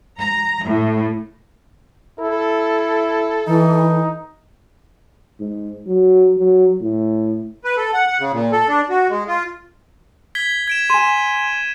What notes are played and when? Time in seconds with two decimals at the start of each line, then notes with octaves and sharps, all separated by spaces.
0.18 A#5
0.65 A2
2.20 E4 A4
3.47 E3 D#4
5.40 G#2
5.87 F#3
6.38 F#3
6.81 A2
7.64 B4
7.77 A4
7.93 F#5
8.07 F#5
8.19 C#3
8.32 A#2
8.52 A4
8.68 D4
8.89 F#4
9.09 G#3
9.27 F4
10.35 G#6 B6 G7
10.68 G#6 D7 E7
10.90 G#5 C6 D#7 E7